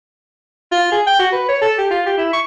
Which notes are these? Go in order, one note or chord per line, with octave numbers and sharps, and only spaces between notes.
F4
G#4
G5
F#4
B4
C#5
A4
G4
F4
G4
E4
C#6